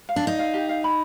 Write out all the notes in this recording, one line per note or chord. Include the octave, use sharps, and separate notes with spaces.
F5
D4
D#4 D5
F5
G4
F5
B5